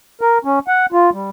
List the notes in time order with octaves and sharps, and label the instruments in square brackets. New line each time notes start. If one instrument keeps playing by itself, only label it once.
[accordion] A#4
C#4
F#5
F4
G3